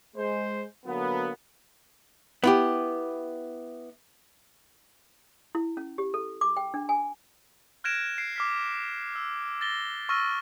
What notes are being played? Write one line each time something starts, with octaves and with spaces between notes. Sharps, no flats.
G#3 C5
D3 F#3 A#3 B3
B3 E4 G4
E4
C#4
G4
A4
D6
G5
D4
G#5
F6 F#6 G#6 A#6 D7 E7
C7 D7
D6 F6 B6
E6
A6 A#6 G7
C#6 E6 F6 A#6 D#7